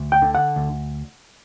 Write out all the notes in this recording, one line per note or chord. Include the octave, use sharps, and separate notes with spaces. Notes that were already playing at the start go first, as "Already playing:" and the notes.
Already playing: D2
G5
D3
F#5
D2